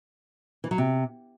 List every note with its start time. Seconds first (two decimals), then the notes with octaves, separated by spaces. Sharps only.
0.64 E3
0.71 F#3
0.78 C3